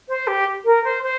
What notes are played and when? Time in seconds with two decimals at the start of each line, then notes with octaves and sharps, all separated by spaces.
0.08 C5
0.27 G4
0.65 A#4
0.84 C5
1.03 C5